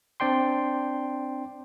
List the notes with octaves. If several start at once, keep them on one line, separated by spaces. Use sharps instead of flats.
C4 D4 D5 G5 C6